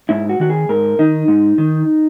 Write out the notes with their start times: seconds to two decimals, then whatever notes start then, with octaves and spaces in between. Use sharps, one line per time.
0.09 G#2 E4
0.29 F#4
0.40 D#3 F#4
0.50 G#4
0.69 G#2 A#4
0.99 D#3 D#4
1.28 G#2
1.58 D#3